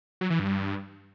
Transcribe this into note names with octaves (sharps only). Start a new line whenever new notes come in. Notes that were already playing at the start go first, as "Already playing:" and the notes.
F#3
E3
G2